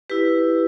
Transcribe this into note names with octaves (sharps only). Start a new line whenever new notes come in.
E4 G4 B4